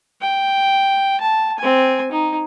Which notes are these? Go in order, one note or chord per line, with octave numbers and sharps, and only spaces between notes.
G5
A5
C4 G#5
D#4